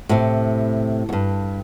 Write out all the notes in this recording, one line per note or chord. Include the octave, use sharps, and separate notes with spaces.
A2 C3
E2 G2